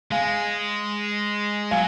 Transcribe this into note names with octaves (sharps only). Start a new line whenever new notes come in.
G#3 F5 G#5
F#3 F5 G#5